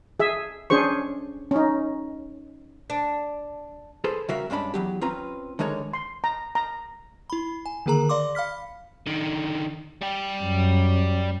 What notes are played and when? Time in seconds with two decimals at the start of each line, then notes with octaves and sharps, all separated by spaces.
0.20 G#4 E5
0.70 C#4 D4 G#4 C5 C#6
1.51 C#4 D#4
2.90 D4
4.04 G#4 A4 B4 C5
4.29 C#3 G3 F#4 A#4 E5 F5
4.50 G2 G#3 C#4 D4 B5
4.74 E2 F#3 G4
5.01 C4 C#4 F4 B4 A#5
5.59 D3 D#3 G#3 A#4 C#5
5.94 C6
6.24 A#5
6.55 A#5
7.30 E4 B5
7.66 G#5
7.86 D3 D#3 A#3 G#4 A#4 A#5
8.09 D5 F5 C6 D6
8.35 F5 B5 F6 B6
9.07 D3 D#3
10.02 G3 G4
10.44 F#2